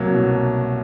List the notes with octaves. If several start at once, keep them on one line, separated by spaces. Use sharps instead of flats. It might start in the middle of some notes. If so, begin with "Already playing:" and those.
Already playing: C2 F#3 A#3
B2